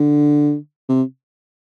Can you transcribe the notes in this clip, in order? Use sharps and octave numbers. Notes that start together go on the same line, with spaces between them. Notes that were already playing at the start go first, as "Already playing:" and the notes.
Already playing: D3
C3